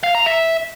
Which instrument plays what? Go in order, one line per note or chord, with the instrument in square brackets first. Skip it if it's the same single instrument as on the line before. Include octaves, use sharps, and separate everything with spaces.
[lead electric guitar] F5
A#5
E5